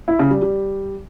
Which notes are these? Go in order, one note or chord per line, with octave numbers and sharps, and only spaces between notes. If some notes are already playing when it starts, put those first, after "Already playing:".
E4
C#3
G3
G3